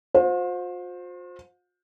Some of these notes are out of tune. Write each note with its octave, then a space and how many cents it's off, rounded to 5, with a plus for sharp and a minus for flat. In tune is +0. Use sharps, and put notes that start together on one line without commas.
F4 +45 C5 +0